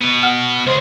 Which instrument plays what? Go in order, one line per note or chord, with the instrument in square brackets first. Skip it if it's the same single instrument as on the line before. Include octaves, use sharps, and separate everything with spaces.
[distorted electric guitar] B2 B3
[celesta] F#5 F6
[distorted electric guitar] C#2 G#4 [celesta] C5 C6